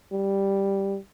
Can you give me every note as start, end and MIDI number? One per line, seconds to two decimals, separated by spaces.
0.12 0.97 55